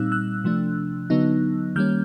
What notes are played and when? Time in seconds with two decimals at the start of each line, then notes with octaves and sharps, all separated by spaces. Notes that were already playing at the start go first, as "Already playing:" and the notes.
Already playing: A#2 G3 C4 D#4 E6 F#6
0.12 E6 F#6
0.44 C3 F3 A3 D4
1.10 D3 F#3 B3 D#4
1.76 D#3 G3 A#3 C#4 F6 G6